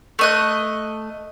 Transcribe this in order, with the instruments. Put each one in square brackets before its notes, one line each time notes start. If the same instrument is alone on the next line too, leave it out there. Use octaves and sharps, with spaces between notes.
[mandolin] A3 D#5 F#6